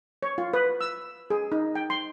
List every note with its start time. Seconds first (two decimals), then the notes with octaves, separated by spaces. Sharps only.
0.23 C#5
0.38 F4
0.54 B4
0.81 E6
1.30 G#4
1.52 D#4
1.75 G5
1.90 C6